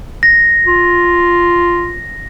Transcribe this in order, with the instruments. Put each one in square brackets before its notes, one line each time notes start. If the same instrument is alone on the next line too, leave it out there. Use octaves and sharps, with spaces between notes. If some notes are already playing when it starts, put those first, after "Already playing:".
[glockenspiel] A#6
[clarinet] F4